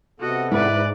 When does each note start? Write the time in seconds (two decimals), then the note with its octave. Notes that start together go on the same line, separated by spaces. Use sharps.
0.20 C3 B3 F#4 A4 D#5
0.52 G#2 E4 B4 D5